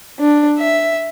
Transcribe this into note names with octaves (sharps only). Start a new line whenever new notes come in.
D4
E5